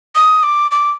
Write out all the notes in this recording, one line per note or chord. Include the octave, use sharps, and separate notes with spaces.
D#6
D6
D6